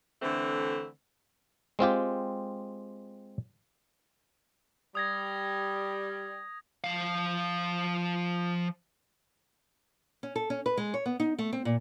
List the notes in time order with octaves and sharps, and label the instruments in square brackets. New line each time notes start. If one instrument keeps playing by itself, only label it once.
[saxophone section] D3 E3 A3 C4
[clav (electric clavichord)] G#3 C4 F4 G4
[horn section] G3 [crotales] D#6 G#6 A#6
[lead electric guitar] F3 F5
[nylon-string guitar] C#4
A4
C#4
B4
G#3
C#5
B3
D#4
A3
C4
A#2